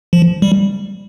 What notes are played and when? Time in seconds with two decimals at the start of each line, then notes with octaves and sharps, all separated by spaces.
0.13 F3
0.42 G3